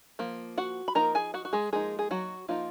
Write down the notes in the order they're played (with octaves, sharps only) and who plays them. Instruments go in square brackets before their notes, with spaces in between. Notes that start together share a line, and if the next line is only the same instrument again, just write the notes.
[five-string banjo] F3 A#3
F#4 F#5
B5
F3 A#3 D#4 A#4 A#5
G#4 G#5
F#4 F#5
F#4
G#3 G#4
F3 G#3 A#3 D#4 G#4
G#4
F#3 F#4
F3 A#3 D#4 F4